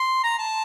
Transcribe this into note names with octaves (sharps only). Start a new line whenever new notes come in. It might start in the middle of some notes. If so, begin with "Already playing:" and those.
Already playing: C6
A#5
A5